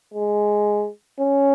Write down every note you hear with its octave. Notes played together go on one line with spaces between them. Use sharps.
G#3
C#4